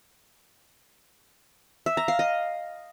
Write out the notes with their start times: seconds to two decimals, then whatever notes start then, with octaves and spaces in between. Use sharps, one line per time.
1.86 E5
1.97 A#5
2.08 F5
2.19 D#5